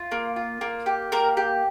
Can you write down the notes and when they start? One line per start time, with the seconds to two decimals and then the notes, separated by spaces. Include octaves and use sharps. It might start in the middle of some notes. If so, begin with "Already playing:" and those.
Already playing: F4
0.12 A#3
0.36 F4
0.61 A#3
0.86 G4
1.12 A#3 A#4
1.37 G4